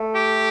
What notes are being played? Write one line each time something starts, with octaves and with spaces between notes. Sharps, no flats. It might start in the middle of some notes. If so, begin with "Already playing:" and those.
Already playing: A3
G4